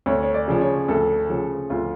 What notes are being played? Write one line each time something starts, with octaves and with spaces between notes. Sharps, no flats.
D2 C#5
C#5
D5
C#3 F3
C#5
D2 A4
C#3 F3
D2 F4